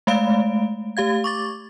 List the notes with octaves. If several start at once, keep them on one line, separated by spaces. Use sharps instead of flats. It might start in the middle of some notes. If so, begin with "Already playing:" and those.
G#3 A3 D5 F5 D7
A3 G4 F5 G#6
C#6 D6 A6